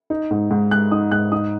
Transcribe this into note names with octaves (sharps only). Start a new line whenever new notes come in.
D#4
G#2
G#2
G#3 F#6
D#4 D#6
G#2 F#6
D#4 D#6